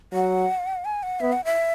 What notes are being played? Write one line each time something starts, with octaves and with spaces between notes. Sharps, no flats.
F#3 F#5
G#5
F#5
B3 E5
F#5
E5